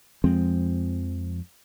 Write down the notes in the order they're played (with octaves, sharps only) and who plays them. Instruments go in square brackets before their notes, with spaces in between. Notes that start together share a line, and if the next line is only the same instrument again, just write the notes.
[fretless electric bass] F2 F3 G#3 C4